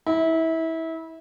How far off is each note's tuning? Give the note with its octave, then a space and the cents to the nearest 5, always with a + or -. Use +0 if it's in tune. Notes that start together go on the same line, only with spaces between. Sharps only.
E4 -25